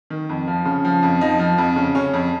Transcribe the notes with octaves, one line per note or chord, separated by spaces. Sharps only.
D#3
F2
F3
C#3
F3
F2
F3 D#4
F3
F2
C#3
C#3 C#4
F2